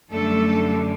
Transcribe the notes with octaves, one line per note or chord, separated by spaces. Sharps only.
F#2 D3 G3 A3 A4